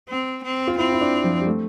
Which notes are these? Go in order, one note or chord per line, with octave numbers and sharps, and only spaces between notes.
C4
C4
F4
C4 E4
E4
D4
F3
G3
A3